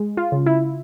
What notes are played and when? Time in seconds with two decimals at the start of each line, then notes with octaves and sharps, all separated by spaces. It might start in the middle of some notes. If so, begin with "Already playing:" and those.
Already playing: G#3
0.17 F4
0.32 C#3
0.46 E4